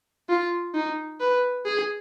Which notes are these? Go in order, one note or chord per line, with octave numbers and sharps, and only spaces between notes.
F4
D#4
B4
G#4